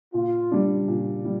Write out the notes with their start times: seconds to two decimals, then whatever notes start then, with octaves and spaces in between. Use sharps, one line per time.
0.14 A#2 F4
0.51 G3 D4
0.88 A#2
1.25 G3